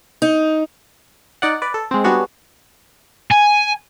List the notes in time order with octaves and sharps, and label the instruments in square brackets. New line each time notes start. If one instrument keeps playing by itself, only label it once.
[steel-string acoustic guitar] D#4
[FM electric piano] D#4 D5 F#5
B4 D5
A4
G#3 C4
G3 B3 D4 F#4 G#4 C#5
[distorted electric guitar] G#5